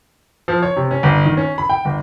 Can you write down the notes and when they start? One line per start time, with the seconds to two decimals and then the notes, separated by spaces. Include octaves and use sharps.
0.48 F3
0.63 C#5
0.76 C3
0.91 C#4
1.03 G1
1.24 D#3
1.37 C#4
1.58 B5
1.69 G5
1.85 G1